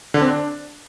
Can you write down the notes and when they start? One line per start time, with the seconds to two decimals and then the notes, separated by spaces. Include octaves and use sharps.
0.14 D3
0.21 C4
0.28 D4